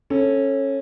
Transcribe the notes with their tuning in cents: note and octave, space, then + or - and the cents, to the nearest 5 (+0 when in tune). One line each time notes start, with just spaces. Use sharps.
C#4 -20 A4 +0